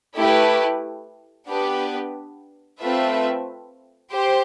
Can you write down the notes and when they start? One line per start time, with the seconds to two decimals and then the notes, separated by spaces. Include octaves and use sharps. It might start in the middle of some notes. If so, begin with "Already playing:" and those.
0.17 A3 E4 G4 B4
1.49 B3 D4 G4 B4
2.80 A3 C4 F4 B4 E5
4.12 G4 C5